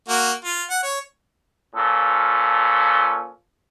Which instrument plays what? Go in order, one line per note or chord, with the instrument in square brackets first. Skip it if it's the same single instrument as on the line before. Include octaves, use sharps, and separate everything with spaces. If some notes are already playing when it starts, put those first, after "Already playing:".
[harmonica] A#3 F#4
F4
F#5
C#5
[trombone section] A#2 F3 C#4 A4